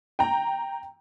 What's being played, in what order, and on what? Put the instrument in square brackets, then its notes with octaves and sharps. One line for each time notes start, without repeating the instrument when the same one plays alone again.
[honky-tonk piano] G5 A#5